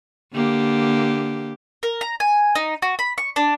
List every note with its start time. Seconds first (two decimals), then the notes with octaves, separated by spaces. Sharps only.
0.34 D3 A#3 G4
1.83 A#4
2.01 A#5
2.20 G#5
2.55 D#4
2.82 F#4
2.99 B5
3.18 C#6
3.36 D4